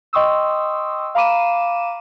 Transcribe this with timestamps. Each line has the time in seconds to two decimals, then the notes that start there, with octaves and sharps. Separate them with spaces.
0.13 D#5 G5 C6 C#6 D#6 E6
1.15 F5 A#5 B5 D6 D#7 E7